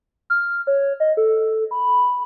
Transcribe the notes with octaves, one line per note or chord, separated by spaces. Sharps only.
F6
C#5
D#5
A4
B5